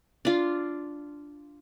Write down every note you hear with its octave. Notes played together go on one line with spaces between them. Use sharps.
D4 F4